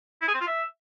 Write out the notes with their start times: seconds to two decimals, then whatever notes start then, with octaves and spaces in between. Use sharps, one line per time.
0.22 E4
0.28 G#4
0.34 C4
0.41 F4
0.47 E5